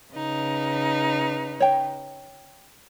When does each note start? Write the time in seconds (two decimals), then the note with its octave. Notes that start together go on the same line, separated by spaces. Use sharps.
0.14 C#3 D#4 B4
1.60 C#5 G5